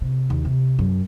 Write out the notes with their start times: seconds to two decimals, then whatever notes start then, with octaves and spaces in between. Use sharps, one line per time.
0.01 C3
0.30 D#2
0.45 C3
0.79 F#2